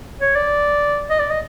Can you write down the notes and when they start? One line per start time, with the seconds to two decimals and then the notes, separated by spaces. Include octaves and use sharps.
0.21 C#5
0.36 D5
1.10 D#5
1.20 D5
1.31 D#5